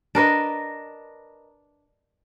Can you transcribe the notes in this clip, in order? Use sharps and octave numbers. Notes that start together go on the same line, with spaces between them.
D4 A#4 B4 D#5